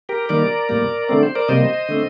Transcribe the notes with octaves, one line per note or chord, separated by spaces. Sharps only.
G4 A#4
D#3 G3 A#3 A#4 D5
A2 G3 A#3
D3 A3 C4 D5
C5
A#4 D5
C3 G3 A#3 C5 D#5
D3 A3 C4